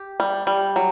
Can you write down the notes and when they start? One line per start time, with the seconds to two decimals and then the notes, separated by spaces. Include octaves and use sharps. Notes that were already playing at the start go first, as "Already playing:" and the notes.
Already playing: G4
0.20 G3
0.47 G3
0.76 F#3